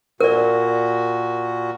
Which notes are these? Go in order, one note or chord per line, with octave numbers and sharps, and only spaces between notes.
A#2 F#4 A#4 D5